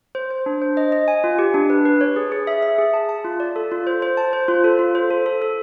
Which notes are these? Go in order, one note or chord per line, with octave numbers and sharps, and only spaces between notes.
C5
C5
D4
C5
D#5
D#5
G#5
F4
G4
D4
B4
B4
C#5
G#4
G#4
E5
E5
G#4
A5
A5
F4
D5
A4
F4
C5
C5
A5
C5
F4
A4
F4
C5
A4
A4
A4